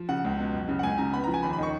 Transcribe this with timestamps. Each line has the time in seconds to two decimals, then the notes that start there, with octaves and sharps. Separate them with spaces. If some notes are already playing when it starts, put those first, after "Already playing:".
Already playing: F3
0.09 C#3 F#5
0.25 C#2
0.39 B2
0.54 F#2
0.69 C#3
0.79 F#5
0.83 C#2 G#5
0.98 C#3 A#5
1.13 B3 B5
1.24 A#5
1.28 F3
1.34 G#5
1.43 D#2 B5
1.53 B5
1.58 D#3 C#6